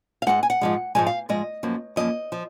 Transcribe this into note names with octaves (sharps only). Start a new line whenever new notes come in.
F5
G#2 F3 G#3 F#5
G#5
F#5
G#2 F3 G#3
G#2 F3 G#3 G#5
F5
G#2 F3 G#3 D#5
F#2 F3 A#3
F#2 F3 A#3 D#5
F3